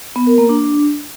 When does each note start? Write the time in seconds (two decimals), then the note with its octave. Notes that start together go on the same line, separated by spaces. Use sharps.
0.16 B3
0.27 A#4
0.38 A#3
0.49 D4